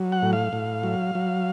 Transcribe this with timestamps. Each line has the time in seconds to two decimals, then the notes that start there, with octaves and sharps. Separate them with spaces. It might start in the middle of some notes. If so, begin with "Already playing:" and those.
Already playing: F#3
0.12 F#5
0.22 A2
0.33 F5
0.53 A2
0.83 F#3
1.15 F#3